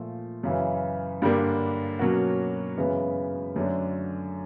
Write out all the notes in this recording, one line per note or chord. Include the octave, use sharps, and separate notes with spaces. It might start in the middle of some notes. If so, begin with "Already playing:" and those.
Already playing: A#2 F3 A3
F#2 C#3 E3
G2 D3 G3 A#3 D4
B2 F#3 A#3 C#4 F#4
F#2 C#3 E3 G#3 B3
F#2 D3 F#3 A3 D4